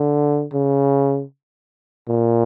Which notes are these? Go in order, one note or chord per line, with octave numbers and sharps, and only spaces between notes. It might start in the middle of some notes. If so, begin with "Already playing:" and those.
Already playing: D3
C#3
A#2